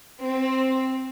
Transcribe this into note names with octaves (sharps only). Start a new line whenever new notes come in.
C4